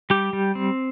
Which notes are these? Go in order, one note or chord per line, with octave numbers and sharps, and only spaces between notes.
G3 G4
G3
C4